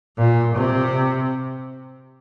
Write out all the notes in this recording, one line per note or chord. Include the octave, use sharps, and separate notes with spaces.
A#2
C3